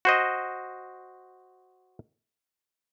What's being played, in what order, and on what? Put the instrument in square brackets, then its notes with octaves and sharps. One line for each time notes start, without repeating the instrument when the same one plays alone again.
[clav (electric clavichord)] F#4 C5 D#5